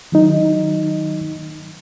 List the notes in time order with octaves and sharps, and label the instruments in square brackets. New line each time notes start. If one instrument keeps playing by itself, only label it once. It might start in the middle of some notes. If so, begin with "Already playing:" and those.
[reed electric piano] D#3 F#3 D#4